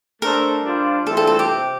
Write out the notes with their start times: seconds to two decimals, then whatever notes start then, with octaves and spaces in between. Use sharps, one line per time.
0.21 A3 D4 A4 A#4 C5
0.63 G3 D4 F4 C5
1.07 G2 E3 A3 C4 F4 A4
1.17 A4
1.27 A4
1.39 G4
1.49 C3